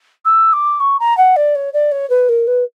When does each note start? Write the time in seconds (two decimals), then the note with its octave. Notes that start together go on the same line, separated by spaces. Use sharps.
0.25 E6
0.53 D6
0.80 C#6
0.99 A#5
1.17 F#5
1.36 D5
1.55 C#5
1.73 D5
1.91 C#5
2.09 B4
2.28 A#4
2.47 B4